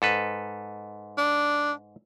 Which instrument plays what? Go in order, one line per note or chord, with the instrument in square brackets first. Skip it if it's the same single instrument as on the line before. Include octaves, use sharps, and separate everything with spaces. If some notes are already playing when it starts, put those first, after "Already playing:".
[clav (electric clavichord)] G#2 A4 B4
[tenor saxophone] D4